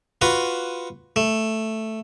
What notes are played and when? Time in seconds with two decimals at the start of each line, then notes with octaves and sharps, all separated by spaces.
0.21 F4 F#4 B4
1.16 A3